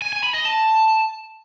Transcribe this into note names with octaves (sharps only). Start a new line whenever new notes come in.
G#5
G#5
B5
D#5
A5